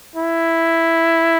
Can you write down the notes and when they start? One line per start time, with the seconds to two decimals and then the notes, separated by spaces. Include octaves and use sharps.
0.16 E4